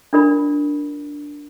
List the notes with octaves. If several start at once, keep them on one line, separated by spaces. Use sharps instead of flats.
D4 F4 A#4 D5 B5